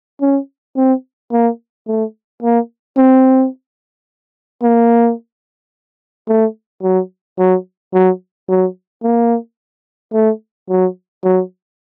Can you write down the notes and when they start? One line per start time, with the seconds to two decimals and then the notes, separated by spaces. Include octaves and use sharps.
0.21 C#4
0.77 C4
1.32 A#3
1.88 A3
2.43 A#3
2.97 C4
4.62 A#3
6.28 A3
6.83 F#3
7.39 F#3
7.94 F#3
8.49 F#3
9.03 A#3
10.13 A3
10.70 F#3
11.24 F#3